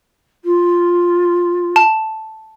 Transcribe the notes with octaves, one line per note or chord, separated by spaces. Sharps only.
F4
A5